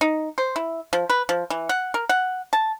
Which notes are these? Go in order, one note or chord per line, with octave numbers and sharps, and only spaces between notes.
D#4
C5
E4
F3
B4
F3
E3
F#5
A#4
F#5
A5